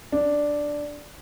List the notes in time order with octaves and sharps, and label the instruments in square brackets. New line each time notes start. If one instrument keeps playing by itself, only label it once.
[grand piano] D4